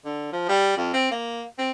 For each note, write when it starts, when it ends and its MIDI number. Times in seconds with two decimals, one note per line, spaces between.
0.05 0.32 50
0.33 0.44 53
0.49 0.73 55
0.77 0.92 41
0.94 1.08 60
1.11 1.42 58
1.58 1.71 60